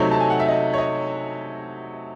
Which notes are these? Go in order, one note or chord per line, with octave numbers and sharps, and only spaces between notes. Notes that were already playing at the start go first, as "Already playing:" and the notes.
Already playing: C3 F#3 A3 D#4 C#5
A5
G#5
F#5
E5
D#5
C#5
D#5